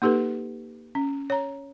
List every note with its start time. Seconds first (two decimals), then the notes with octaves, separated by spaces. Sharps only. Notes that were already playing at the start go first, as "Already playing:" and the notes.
0.02 A#3 D#4 G4 A4 B4
0.95 C#4
1.30 C#5 A#5